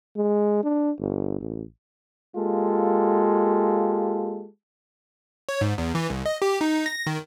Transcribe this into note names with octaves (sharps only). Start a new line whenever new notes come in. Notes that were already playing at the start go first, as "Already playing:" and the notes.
G#3
D4
G1
A1
G#3 A#3 F4 G4 A4
C#5
G#2
E2
E3
C2
D#5
G4
D#4
A#6
D#3